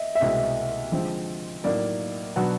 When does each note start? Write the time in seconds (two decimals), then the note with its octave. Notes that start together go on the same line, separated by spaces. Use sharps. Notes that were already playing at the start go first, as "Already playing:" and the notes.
Already playing: D#5 E5
0.15 E5
0.21 C2 B2 G#3 C4 D#5
0.92 D3 F3 G#3 C4 F4
1.64 A2 F#3 A#3 D#4 D5
2.36 B2 F#3 B3 D4 F#4